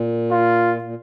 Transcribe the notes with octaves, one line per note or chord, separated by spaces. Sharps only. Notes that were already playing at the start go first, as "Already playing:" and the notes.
Already playing: A#2
F4
A#2